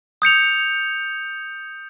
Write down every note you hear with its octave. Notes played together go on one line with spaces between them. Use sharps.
D#6 G6 C#7 F7